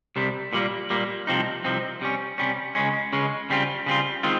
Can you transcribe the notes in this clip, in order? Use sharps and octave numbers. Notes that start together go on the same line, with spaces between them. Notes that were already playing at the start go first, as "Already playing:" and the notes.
C2 C3 G3
A#2 G3 A#3
A#2 G3 A#3
C2 C3 F3 C4 D#4
C2 C3 F3 C4 D#4
C3 G3 C#4
C3 G3 C#4
C#2 C#3 G#3 C#4
C#2 C#3 G#3 C#4
C#3 G3 C4 F4
C#3 G3 C4 F4
D#3 G#3 C4 F4